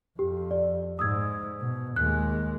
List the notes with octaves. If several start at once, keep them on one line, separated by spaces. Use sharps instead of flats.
F2 G4
D5
G#2 D#6 E6 G#6
B2
D#2 G#3 F#6